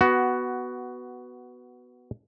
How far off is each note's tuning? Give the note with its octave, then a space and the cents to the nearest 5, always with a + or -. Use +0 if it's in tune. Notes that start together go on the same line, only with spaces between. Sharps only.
B3 +0 F#4 +10